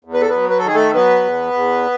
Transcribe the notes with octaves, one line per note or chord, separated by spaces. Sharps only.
E2
B4
A4
F#3 B3 B4
B4
A4
D#3 G#4
A3 A4
F#3 B3 B4
E2
E2